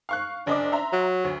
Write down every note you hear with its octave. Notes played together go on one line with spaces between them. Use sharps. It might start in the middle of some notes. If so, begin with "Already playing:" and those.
F5 C#6 F#6
F#1 D4 D#5 D6
E5 A#5 C6
F#3
D2